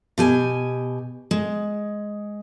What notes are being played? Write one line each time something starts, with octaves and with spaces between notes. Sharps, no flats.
B2 G4 G#5
G#3